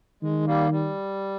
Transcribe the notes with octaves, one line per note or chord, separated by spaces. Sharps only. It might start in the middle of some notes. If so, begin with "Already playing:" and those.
D#3 G#3
G3 A#3
G3